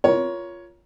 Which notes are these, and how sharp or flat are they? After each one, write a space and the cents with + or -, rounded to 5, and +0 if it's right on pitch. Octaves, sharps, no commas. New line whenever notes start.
F4 -5 A#4 +25 C#5 +10